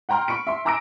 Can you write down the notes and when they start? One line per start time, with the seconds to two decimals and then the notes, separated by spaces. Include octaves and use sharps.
0.09 F#5 G5 A#5 C6 F6
0.28 B5 C#6 C#7 D7
0.47 E5 C6
0.65 G#5 A#5 D6 E6 A#6 D7